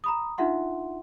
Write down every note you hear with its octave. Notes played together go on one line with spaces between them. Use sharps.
A#5 B5 D#6
D4 D#4 F4 E5 F#5 C6